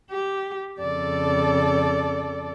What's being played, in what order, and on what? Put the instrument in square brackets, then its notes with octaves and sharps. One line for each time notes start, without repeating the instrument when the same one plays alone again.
[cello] G4
[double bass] F2 C#3 [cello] A4 D5